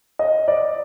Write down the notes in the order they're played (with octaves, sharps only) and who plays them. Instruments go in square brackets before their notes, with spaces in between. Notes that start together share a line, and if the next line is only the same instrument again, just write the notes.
[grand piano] D#5
D5